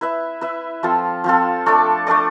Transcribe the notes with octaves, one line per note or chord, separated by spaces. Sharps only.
E4 B4 E5
E4 B4 E5
F3 C4 F4 A4
F3 C4 F4 A4
A3 D4 A4 D5
A3 D4 A4 D5